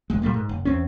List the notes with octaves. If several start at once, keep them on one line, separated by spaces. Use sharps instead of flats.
E1 G#3
A#2 G3 A3 A#3
G#2
F#1
E2 C4 C#4